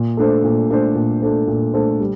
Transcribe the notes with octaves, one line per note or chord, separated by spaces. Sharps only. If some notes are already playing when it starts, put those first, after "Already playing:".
Already playing: A#2
A3 D4 A4 C5
A#2
A3 D4 A4 C5
A#2
A3 D4 A4 C5
A#2
A3 D4 A4 C5
G3